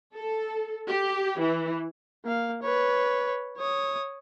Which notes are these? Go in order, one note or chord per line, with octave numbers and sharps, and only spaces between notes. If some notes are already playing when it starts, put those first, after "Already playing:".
A4
G4
E3
A#3 F5
B4 C#5
C#5 D#6